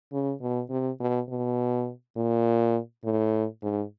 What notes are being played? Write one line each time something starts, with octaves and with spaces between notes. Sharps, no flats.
C#3
B2
C3
B2
B2
A#2
A2
G#2